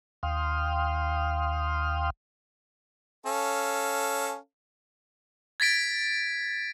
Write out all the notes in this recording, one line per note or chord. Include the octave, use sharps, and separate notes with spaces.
D#2 F5 G5 C6 D#6 F6
C#4 A4 F5
G#6 A6 B6 D7